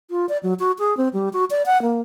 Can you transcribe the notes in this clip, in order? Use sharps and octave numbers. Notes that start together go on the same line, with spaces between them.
F4
D5
F#3
F#4
G#4
C4
G3
F#4
D5
F#5
A#3